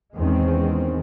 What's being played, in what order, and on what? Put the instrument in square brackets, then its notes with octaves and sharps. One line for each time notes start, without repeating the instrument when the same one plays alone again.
[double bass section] E2 D#3 G#3 C4 C#4